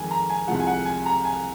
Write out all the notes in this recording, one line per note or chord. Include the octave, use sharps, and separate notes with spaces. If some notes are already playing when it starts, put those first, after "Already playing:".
Already playing: F2 D#3 G#3 G#5
A#5
G#5
C2 C3 F3 G#3 F#5
G#5
F#5
G#5
A#5
G#5